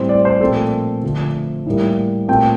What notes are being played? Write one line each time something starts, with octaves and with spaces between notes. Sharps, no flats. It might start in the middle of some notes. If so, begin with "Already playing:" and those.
Already playing: A2 G3 C4 C5
D5
C5
A#2 F3 A3 C4 A4
D3 F3 A3
A2 G3 A#3
A#2 A3 C4 G5